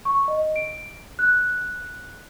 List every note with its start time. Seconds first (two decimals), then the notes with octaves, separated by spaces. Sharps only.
0.05 C#6
0.28 D#5
0.56 D7
1.19 F#6